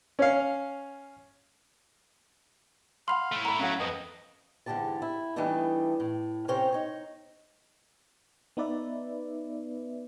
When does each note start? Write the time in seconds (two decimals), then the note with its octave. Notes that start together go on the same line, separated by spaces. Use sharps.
0.19 C#4 C#5 F5
3.08 F5 F#5 B5 C6
3.32 A3 E4
3.45 F#5 A#5 B5
3.59 F#3 C#4 F5 F#5
3.80 F2 B4 D#5
4.66 E2 G#2 D3 E4 G4 A5
5.02 E4
5.36 E3 G3 A3 B3 D4 D#4
6.00 A2
6.48 C3 C#4 A#4 C5 C#5 G5
6.73 D#4 C#5
8.57 B3 D#4 B4 D5 E5